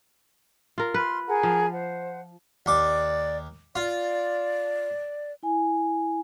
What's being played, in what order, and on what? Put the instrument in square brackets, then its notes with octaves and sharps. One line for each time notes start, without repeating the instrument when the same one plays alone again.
[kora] F4 A#4
[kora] B4 [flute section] C6 F6
[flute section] G#4 A#4 F#5
[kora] F3
[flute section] C5 F#5
[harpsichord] D#2 D6 [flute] D5
[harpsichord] F4 [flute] D5
[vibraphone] E4 G#5